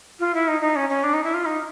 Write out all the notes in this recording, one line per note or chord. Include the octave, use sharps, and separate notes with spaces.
F4
E4
D#4
D#4
C#4
C#4
D4
D#4
E4
F4
D#4